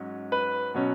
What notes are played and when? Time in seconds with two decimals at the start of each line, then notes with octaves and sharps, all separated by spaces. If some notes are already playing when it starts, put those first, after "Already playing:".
Already playing: G#2 F#3 C#4
0.32 B4
0.74 B2 F#3 C#4